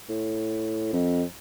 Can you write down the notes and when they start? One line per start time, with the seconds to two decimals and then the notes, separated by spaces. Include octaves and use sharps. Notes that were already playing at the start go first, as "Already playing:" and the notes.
0.09 A2
0.93 F2